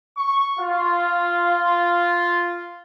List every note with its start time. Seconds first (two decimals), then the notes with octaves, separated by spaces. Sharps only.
0.18 C#6
0.59 F4